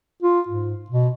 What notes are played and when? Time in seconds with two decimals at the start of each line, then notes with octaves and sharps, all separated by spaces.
0.22 F4
0.48 G#2
0.90 B2